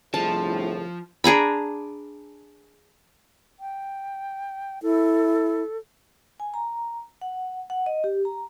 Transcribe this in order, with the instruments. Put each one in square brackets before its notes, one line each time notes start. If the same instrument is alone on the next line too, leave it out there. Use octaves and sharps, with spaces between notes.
[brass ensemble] G1 C2 A2 [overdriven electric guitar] F3 [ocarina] G#4 [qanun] A5
[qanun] D4 G#4 A#5 B5
[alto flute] G5
[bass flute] E4 [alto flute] A4
[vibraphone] G#5
A#5
F#5
F#5
D#5
G4
A#5